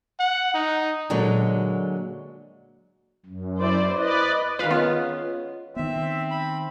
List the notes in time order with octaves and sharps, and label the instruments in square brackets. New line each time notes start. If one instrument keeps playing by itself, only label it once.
[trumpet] F#5
D#4
[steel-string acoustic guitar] A#2 D3 F#3 G#3
[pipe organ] F#2
[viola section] E4 C5 D5
[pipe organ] B4 D5 [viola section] D#5
[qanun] D#3 G#3 F4 [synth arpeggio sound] B4 F5
[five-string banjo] B3 [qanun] C#4 [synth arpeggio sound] F4
[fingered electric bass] D#3 B3 [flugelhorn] C4 [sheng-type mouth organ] E5
[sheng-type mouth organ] B5